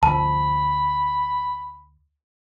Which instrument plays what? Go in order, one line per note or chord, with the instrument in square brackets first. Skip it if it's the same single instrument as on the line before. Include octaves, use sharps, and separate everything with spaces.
[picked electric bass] D2 F3 [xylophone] A5 [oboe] B5